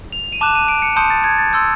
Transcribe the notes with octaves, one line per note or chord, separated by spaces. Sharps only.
F7
D#7
A5 D6 F#6 E7
D#7
D7
C#7
A5 C6 D#6 G6 C#7
A6
G#6
A6
C6 E6 G6